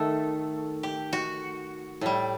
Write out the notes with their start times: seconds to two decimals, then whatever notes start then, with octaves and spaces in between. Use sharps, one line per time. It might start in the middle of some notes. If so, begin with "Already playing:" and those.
Already playing: D#3 A3 A4
0.83 G4
1.13 F#4
2.01 A2 G3